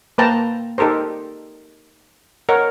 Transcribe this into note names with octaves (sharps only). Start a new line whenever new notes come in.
A#3 B4 C5 G5 A5 A#5
D#4 G4 A4 A#4 C5
A#4 C#5 D#5 F#5